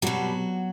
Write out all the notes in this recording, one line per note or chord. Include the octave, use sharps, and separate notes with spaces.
B2 F#3 G3 F#4